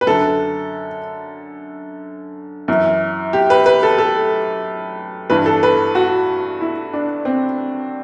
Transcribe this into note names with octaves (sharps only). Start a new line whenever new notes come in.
B4
F#2 D3 A4
F#2 E3
G4
B4
B4
A4
A4
G2 E3 B4
A4
B4
F#4
E4
D4
C4